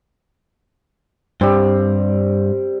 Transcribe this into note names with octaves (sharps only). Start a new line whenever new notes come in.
G2 G3 C4